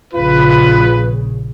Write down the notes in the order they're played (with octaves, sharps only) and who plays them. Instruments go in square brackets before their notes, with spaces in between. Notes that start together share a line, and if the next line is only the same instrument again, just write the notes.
[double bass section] A#1 C#3 [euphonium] F4 [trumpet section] B4